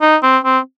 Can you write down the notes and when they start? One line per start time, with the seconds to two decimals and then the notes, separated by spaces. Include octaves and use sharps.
0.02 D#4
0.23 C4
0.44 C4